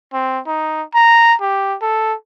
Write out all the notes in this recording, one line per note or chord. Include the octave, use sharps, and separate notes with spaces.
C4
D#4
A#5
G4
A4